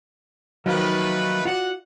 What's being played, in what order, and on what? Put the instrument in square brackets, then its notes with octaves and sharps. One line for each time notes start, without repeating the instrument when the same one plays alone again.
[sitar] D#3 F3 A#3 [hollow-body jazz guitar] F#3 [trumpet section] A3 B4
[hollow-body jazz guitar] F4 F#4 D5 [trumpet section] F#5